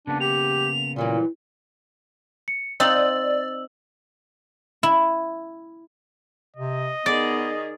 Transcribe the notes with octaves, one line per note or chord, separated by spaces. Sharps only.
C#3 A#3 B3 D4
G4 F7
A#2 E3 F#3 G3
C#7
C4 D#4 D5 F5 E6 F#7
E4
C3 D#5
D#3 B3 G#4 D5